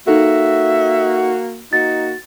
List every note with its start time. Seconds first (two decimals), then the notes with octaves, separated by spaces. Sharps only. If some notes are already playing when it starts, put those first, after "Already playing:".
0.07 A#3 D#4 F#4 A4 E5
1.73 A#3 D#4 F#4 A6